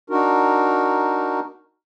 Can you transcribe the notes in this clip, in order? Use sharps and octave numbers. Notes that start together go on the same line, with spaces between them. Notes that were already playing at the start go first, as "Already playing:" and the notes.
D4 D#4 F#4 A#4